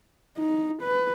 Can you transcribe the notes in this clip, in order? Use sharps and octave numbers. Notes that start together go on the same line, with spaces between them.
D#4
B4